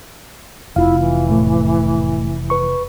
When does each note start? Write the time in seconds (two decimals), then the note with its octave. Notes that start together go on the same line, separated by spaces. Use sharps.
0.76 F1 E4 F4 F5
0.99 E3
1.29 A2 A3
2.50 B4 C#6